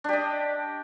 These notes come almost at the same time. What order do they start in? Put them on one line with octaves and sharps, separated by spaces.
D4 G4 D#5